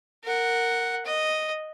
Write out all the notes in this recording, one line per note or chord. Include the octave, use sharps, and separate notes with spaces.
A#4 F#5
D#5